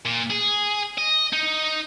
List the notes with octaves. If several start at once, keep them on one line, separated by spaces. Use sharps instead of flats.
A#2
G#4
D#5
D#4